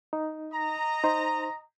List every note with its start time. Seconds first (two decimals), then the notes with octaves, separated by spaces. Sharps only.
0.13 D#4
0.52 D#5 A#5
1.04 D#4 C5